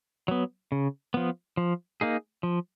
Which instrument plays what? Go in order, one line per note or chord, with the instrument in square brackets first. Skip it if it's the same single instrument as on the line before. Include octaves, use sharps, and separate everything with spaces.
[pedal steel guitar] F#3 B3
C#3
F3 B3
F3
A#3 D#4 G#4
F3